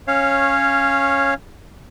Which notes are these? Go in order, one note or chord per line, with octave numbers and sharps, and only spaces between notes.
C#4 C#5 F5